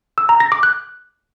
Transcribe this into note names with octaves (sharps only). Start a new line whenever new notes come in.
E6
A#5
A#6
D6
F#6